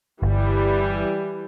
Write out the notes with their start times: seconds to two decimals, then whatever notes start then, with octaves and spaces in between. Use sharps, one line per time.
0.23 G1 E3 G3